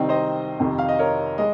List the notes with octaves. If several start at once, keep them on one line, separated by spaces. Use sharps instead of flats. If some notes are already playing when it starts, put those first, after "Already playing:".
Already playing: C2 C3 D#3 C4 D#4
C5 D#5
F2 C3 D#3
F5
D#5
A#4 C#5
G#3 D#5